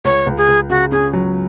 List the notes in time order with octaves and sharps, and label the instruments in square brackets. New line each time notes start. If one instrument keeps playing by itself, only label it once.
[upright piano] C#2 [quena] C#5
[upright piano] C#2
[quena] G#4
[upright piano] C#2
[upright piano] C#3 [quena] F#4
[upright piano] C#4 [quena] G#4
[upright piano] F#3